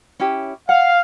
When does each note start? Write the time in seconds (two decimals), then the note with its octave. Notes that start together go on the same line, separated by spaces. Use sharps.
0.20 C#4 E4 G4
0.69 F5 F#5